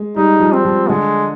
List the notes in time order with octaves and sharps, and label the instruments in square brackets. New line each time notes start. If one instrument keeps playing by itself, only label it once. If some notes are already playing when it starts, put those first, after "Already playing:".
Already playing: [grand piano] G#3
[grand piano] G3 [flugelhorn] D#4
[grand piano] F3
[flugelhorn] C4
[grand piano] F3
[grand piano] D3 [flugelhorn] G#3